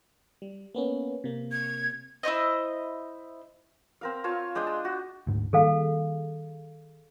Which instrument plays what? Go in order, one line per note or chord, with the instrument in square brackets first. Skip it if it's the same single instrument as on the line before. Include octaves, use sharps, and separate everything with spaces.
[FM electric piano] G3
A#3 B3 C#4
C3 A#3
[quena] G#6
[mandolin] E4 F#4 C5 D#5
[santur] C4 A#4 F5
F4 C#5 A5
G#3 D4 G5 D#6
A5
F#4
[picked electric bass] D2 G#2
[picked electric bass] D#3 G3 A#3 [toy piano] G#4 A4 F5